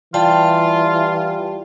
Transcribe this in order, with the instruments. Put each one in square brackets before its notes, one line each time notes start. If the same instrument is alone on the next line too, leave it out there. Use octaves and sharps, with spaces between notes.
[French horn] E3 [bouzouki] G3 [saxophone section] F4 [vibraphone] A5